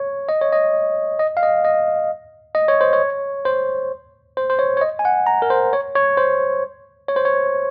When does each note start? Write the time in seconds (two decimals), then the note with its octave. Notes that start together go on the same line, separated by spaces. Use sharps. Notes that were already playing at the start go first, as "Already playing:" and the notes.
Already playing: C#5
0.29 D#5
0.41 C#5
0.53 D#5
1.19 D#5
1.37 F5
1.43 D#5
1.65 D#5
2.55 D#5
2.68 C#5
2.81 C5
2.93 C#5
3.45 C5
4.37 C5
4.50 C5
4.59 C#5
4.77 C#5
4.81 D#5
4.99 G#5
5.05 F#5
5.27 A#5
5.42 A#4
5.50 C5
5.73 C#5
5.95 C#5
6.18 C5
7.08 C#5
7.16 C5
7.25 C#5